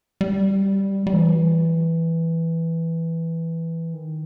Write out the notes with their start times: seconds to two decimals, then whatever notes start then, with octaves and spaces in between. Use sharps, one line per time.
0.21 G3
1.07 G3
1.13 E3
3.93 D#3